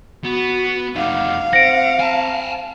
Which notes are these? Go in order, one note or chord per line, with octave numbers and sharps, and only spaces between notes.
B3 F#4
F2 D#4 F5 F#5 D6
C4 C5 F#5 A#6 D7
G#5 A5